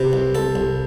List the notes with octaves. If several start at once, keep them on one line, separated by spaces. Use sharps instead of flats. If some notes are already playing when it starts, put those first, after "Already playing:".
Already playing: C3 B4
C2
C2 A4
C2